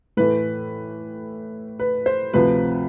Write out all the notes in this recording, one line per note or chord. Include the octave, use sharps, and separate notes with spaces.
A2 E3 A3 B4
B4
C5
D2 C3 F3 B4